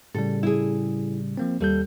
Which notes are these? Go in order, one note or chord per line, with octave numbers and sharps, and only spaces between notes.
A2 C#3 G3 A4
E4 G#4
F3 A#3 C4
D#2 G3 A4 G6